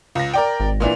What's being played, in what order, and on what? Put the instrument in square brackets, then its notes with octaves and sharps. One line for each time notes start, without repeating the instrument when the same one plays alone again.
[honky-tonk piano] C#2 A#6
A#4 D5 G5
[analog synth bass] G#1
[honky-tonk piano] A#2 E3 D4